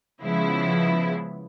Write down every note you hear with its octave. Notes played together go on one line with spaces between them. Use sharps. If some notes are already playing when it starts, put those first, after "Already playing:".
C#3 F3 G#3 B3 E4